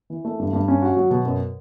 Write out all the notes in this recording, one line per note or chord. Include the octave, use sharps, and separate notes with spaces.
E3
A3
G2
G2
C#4
F#4
F#3
B2
F#2